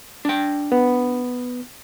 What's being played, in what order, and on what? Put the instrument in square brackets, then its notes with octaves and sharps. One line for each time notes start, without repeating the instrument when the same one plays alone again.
[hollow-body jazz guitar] D4 G5
[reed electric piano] B3